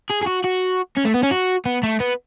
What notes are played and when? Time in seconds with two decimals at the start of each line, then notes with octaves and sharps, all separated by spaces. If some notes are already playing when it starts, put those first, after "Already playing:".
0.10 G#4
0.23 G#4
0.27 F#4
0.44 F#4
0.97 C#4
1.05 A3
1.14 B3
1.23 C#4
1.31 F#4
1.65 B3
1.83 A3
2.00 B3